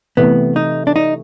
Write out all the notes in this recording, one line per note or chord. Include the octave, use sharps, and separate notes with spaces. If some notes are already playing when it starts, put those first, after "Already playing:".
C3 E3 A3 B3
D#4
D4
D#4